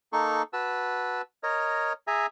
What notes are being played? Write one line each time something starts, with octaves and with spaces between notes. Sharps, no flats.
A#3 D#4 A4 C#6
F#4 B4 A5 E6
A#4 C#5 D#5
G#4 E5 G#5 A#5